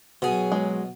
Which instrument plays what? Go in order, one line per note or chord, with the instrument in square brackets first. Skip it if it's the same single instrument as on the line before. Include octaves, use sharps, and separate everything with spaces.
[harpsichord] B2 [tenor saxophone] F#3 [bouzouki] C#4 G#4
[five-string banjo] G#3